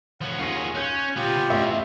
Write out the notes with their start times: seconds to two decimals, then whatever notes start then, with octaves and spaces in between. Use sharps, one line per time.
0.21 F3 C#4 F#5
0.39 D#2 F4 G#4 C#6 A#6
0.75 C#4 C#5 F#6 G6
1.16 C3 B3 F4 G4
1.49 A1 E2 E5 C#6